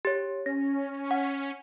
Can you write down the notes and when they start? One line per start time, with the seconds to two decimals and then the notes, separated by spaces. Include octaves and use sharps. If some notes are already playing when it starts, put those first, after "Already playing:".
0.05 G4 C#5
0.46 C#4 A#6
1.11 F#5